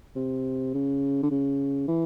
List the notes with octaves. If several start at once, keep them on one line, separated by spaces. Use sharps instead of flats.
C3
C#3
D3
C#3
E3